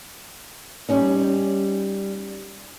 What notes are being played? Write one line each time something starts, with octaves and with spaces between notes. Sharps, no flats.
G3 C#4 D#4